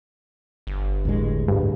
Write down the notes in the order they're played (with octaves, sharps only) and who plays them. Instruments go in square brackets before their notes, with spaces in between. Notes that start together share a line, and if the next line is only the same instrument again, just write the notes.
[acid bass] G1
[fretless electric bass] D2 A2 G#3
[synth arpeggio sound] G2